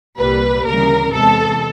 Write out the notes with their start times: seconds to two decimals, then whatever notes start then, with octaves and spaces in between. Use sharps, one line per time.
0.17 C2 A#2 G3 A#3 B4
0.65 D2 C#3 E3 G3 A#4
1.13 E2 C3 E3 G#3 A4